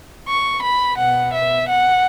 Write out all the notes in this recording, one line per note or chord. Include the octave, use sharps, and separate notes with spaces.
C#6
B5
B2 B3 F#5
E5
F#5